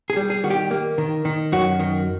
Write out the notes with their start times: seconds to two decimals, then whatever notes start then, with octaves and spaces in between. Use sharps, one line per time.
0.10 G#4
0.16 G3
0.30 G#4
0.44 D#3 F#4
0.50 G4
0.71 A#3
0.98 D#3
1.25 D#3
1.52 F#2 F#4
1.79 D#3